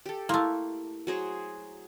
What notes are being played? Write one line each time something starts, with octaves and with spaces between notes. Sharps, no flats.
G4 A4
A3 A#3 E4 F5 C6
F#3 G#4 C5